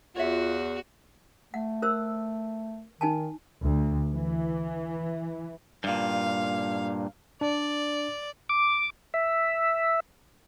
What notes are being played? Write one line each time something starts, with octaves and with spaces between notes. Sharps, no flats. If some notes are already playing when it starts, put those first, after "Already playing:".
E2 F4 F#4 C#5 E5
A3 F#5
A#4 C5 E6
D#3 D#4 G#5 A5
D2
E3
G2 A#2 F5
D4 D5
D6
E5